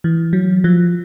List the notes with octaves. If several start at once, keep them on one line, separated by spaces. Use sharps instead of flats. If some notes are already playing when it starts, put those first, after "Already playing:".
E3
F#3
F3